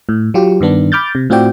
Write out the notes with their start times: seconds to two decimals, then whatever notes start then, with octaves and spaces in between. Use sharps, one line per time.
0.09 A2
0.34 F#3 F4 G4
0.61 G2 D#3 B3 D4
0.92 B5 D6 F6 G6 A6
1.15 C3
1.30 A2 C4 F4 F#4 D5 G5